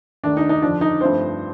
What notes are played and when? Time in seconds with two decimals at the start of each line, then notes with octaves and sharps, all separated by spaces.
0.23 D#2 D#3 A3 D4
0.37 D#4
0.49 D#4
0.62 F2 D3 F3 D4
0.81 D#4
1.01 G2 F3 A3 C4 C5